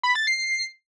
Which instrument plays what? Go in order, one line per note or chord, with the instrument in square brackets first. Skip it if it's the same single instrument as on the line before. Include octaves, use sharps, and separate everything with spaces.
[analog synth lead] B5
A6
C7